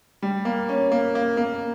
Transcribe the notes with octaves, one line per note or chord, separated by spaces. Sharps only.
G3
A#3
C#4
A#3
A#3
A#3